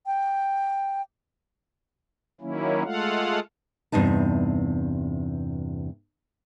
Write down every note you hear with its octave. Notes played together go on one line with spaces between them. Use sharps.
G5
D#3 F#3 A#3 C#4 E4
G#3 A3 F4 A4 F5 F#5
E2 G2 C3 D#4 A5